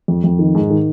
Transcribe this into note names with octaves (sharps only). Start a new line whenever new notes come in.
F2
F2
D#3
G#2
D#3